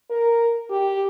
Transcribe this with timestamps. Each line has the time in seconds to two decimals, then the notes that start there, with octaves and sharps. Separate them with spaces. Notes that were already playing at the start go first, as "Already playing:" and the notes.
0.10 A#4
0.70 G4